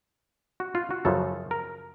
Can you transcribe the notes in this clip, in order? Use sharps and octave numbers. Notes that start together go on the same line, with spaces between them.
F#4
F4
F#4
F#2 C#3 F3 A4
A#4